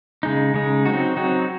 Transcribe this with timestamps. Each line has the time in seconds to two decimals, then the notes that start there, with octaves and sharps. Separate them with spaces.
0.23 C#3 G#3 D#4
0.54 C#3 G#3 D#4
0.85 F#3 C4 D#4 F#4
1.17 F#3 C4 D#4 F#4